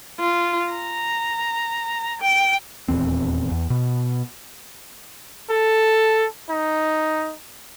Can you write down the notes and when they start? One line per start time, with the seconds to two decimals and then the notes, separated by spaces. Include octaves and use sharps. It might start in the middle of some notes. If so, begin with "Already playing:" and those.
0.20 F4
0.72 A#5
2.22 G5
2.88 D#1 G#1 E2 C4
3.52 E2
3.70 B2
5.50 A4
6.50 D#4